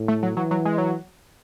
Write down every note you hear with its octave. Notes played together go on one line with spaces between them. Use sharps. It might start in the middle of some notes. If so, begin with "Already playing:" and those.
Already playing: A2
A3
F#3
E3 F#3
F#3
G#3
F#3